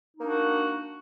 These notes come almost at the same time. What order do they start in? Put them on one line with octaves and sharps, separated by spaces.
D#4 A#3 D4 F#4